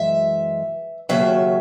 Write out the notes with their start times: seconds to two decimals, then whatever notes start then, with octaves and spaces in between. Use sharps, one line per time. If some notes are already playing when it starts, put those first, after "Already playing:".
Already playing: F#2 E3 G#3 E5
1.09 D#2 C#3 F#3 E5